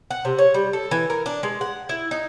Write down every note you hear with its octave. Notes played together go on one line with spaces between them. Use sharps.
F#5
C3
C#5
G3
A4
E3
A#4
D4
G#3
F#5
E4
D#4